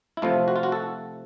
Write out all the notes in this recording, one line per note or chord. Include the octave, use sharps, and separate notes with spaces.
E4
C3 F3 A3 F4
F#4
F4
F#4
A4